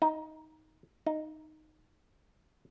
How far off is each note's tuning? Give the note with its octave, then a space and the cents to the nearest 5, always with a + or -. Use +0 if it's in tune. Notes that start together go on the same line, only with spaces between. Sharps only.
D#4 +10
D#4 -5